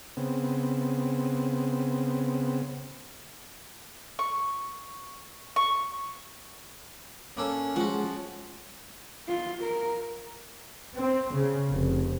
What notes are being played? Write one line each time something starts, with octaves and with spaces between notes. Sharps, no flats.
C#3 B3 C4
C#6
C#6
A#3 C#4 D4 A4
F3 G#3 F#4 F#5
F4
A#4
C4
C#3
F1